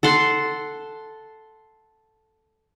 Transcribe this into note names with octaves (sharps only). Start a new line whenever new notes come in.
A4 F#5 C6